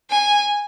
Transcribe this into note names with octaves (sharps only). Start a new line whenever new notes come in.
G#5